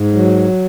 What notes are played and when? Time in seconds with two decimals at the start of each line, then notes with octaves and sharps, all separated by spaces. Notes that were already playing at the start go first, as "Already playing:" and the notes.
Already playing: G#2
0.14 F#3